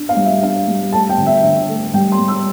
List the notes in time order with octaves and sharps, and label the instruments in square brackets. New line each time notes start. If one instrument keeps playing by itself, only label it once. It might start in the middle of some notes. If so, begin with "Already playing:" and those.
Already playing: [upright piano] D4
F5
G3
E5
D4 F5
G3
A3 A5
G5
D3
E5
D3 E5
A3
G3 G5
C6
G3
E6